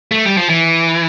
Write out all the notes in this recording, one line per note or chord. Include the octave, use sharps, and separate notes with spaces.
A3
G3
F3
E3